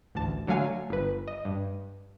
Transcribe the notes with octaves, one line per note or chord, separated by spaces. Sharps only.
A1 D2 A5
D3 F#3 A3 F5 G#5 C7
G1 B4
D#5
G2